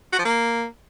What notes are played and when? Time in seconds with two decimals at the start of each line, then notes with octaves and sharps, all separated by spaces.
0.13 F#4
0.19 F3
0.25 A#3